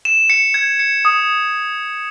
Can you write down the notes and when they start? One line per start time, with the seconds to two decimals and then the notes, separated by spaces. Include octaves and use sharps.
0.05 E7
0.30 C#7
0.54 G#6
0.79 C#7
1.05 D#6